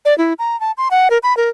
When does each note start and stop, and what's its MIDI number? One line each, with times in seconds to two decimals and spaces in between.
0.05 0.16 74
0.18 0.33 64
0.39 0.59 82
0.60 0.72 81
0.78 0.88 84
0.91 1.08 78
1.10 1.18 70
1.23 1.36 83
1.37 1.49 70